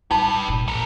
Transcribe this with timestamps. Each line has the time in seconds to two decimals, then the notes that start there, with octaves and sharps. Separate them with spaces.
0.11 A1 G3 D#4 G4 B4 A5
0.48 F1 A#2
0.68 A1 A4 A#4